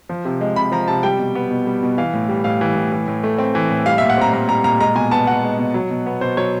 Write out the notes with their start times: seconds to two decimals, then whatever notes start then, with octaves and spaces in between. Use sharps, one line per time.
0.09 F3
0.25 C3
0.41 G#3
0.56 C3 B5
0.72 F3 A#5
0.88 C3 A5
1.03 G3 G5
1.19 B2
1.35 B3
1.51 B2
1.67 G3
1.83 B2
1.98 E3 F5
2.13 A2
2.29 G3
2.44 A2 F5
2.61 E3
2.76 A2
2.92 E3
3.08 A2
3.24 A3
3.39 C4
3.55 E3
3.71 A2
3.86 G3 F5
3.98 A#2 E5
4.09 F#5
4.17 C4 A#5
4.33 A#2 A#5
4.49 G3 A#5
4.64 A#2 A#5
4.80 G#3 A#5
4.95 B2 G#5
5.11 B3 A5
5.27 B2 F#5
5.43 G#3
5.58 B2
5.74 F#3
5.90 B2
6.06 B3
6.21 B2 C5
6.37 F#3 C#5